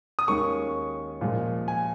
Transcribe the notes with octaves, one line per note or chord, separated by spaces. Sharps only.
D#6
D#2 D#3 G#3 C#4 C#6
A#2 F3 G#3
G#5